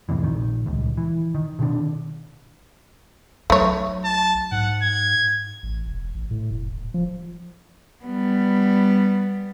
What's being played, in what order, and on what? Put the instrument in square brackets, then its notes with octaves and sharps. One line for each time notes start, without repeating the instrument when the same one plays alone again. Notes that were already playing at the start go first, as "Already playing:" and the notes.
[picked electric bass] E2 A2 C3 E3
A#1 D#3
D#1 C#2
E3
D#3
B2 D#3 D4
[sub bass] B1 [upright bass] F#3 [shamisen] A3 C#5
[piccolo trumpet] A5
[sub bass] G#2 [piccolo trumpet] F#5
[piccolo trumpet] G#6
[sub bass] A1
E1
A1
A2
F1
D#1
F3
[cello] G3 B3